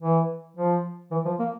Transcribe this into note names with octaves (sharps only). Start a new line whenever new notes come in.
E3
F3
E3
F3
A#3